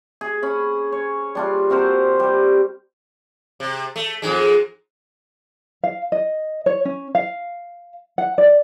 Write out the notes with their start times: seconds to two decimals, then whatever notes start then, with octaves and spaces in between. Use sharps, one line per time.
0.21 G#4
0.43 C#4 B5
0.92 C#5
1.35 G3 D4 F4
1.70 C4 F#4 A#4 C5
2.19 G3 G4
3.60 C3
3.96 A3
4.22 F2 G#2 G#3
5.84 F5
6.12 D#5
6.66 C#5
6.85 C#4
7.15 F5
8.18 F#5
8.38 D5